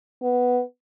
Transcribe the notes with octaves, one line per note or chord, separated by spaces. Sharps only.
B3